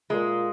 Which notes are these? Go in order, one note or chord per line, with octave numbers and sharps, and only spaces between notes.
A#2 G#3